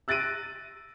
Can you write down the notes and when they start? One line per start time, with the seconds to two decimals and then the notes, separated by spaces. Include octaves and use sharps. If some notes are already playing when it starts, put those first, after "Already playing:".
0.08 E6 F#6 A6 A#6 D7 D#7